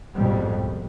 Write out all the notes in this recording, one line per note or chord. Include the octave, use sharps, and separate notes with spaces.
A1 F2 G#2 B2 G3
C2